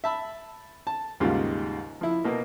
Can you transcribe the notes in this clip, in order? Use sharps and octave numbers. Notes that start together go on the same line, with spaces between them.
E5 A5 B5
A5
D#2 G#2 C#3 G3 F4
F3 E4
B2 A#3